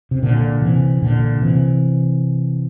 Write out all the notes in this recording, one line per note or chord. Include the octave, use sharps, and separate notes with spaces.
C3
A#2 D3
C3 E3
A#2 D3
C3 E3